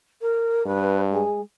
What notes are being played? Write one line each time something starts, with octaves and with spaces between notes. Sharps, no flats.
A#4
G2 B4
G#3